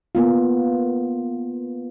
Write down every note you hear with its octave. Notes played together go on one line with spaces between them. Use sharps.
A#3 B3 F4